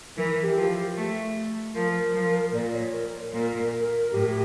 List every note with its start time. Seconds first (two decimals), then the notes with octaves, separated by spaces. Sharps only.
0.17 E3 A#4
0.43 G4
0.56 F3
0.97 A3
1.74 F3 A#4
2.14 F3
2.54 A#2 D5
2.74 C#5
2.94 A#4
3.33 A#2 A#4
3.72 A#4
4.11 A2 G4
4.29 G4